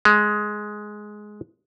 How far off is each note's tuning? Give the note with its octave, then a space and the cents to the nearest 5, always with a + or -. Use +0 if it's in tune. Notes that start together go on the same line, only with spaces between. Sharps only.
G#3 +10